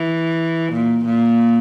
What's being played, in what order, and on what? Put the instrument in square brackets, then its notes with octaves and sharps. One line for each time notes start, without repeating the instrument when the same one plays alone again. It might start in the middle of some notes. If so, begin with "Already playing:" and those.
Already playing: [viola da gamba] E3
A#2
A#2